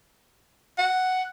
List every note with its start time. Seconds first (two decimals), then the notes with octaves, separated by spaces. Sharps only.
0.78 F#5